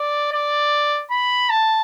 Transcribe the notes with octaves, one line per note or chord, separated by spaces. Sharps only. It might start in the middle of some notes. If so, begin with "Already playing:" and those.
Already playing: D5
D5
B5
A5